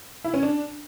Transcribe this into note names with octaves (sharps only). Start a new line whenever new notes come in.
E4
C#4
D4